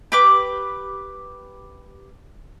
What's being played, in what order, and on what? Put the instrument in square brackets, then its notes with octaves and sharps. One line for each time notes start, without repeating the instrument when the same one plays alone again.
[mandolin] G4 B4 D6